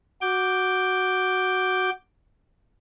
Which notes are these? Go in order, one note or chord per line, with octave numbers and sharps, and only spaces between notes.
F#4 D6 G6